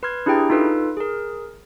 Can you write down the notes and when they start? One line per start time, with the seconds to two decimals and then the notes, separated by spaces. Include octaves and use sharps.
0.03 B4 C6 F6 G#6
0.26 D4 E4 G4 G#4 G5 A#5
0.50 D#4 F4 A4 B4
0.97 G#4 A#4